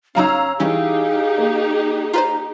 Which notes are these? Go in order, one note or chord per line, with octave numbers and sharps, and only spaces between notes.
C#3 F#3 C#4 D#4 F5 A#5 E6
E3 G3 C#4 D#4 G4 G#4 F5
A#3
F4 B4 C5 A#5